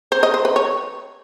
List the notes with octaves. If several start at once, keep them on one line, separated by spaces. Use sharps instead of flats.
C5
D#5
C5
B4
C#5